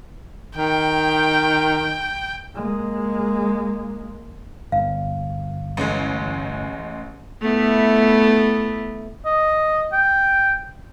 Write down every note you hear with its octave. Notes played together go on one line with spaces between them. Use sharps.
D#3 G5
G#3 A#3
G1 F5
A1 G#3
A3 B3 E4
D#5
G5